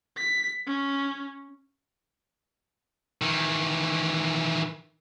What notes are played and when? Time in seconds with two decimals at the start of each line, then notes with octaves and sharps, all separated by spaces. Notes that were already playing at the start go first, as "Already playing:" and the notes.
0.17 B6
0.67 C#4
3.22 D#3 E3